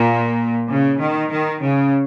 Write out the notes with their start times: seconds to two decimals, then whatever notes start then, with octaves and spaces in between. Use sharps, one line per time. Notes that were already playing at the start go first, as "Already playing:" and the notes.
Already playing: A#2
0.70 C#3
1.01 D#3
1.31 D#3
1.62 C#3